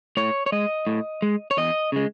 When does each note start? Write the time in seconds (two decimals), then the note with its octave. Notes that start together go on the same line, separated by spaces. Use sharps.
0.17 A2 C#5
0.46 C#5
0.52 G#3 D#5
0.87 A2
1.22 G#3
1.51 C#5
1.57 E2 D#5
1.92 C#3 G#3